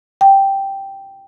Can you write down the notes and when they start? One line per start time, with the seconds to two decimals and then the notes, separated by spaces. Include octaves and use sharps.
0.21 G5